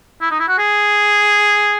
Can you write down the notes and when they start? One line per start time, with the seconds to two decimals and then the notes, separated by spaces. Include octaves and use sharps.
0.21 E4
0.31 D#4
0.40 E4
0.48 F#4
0.58 G#4